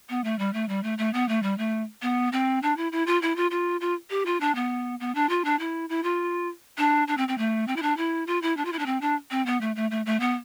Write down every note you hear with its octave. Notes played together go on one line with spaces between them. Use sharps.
B3
A3
G3
A3
G3
A3
A3
B3
A3
G3
A3
B3
C4
D4
E4
E4
F4
E4
F4
F4
F4
G4
F4
D4
B3
B3
D4
F4
D4
E4
E4
F4
D4
D4
C4
C4
A3
C4
E4
D4
E4
F4
E4
D4
F4
E4
D4
C4
D4
C4
B3
A3
A3
A3
A3
B3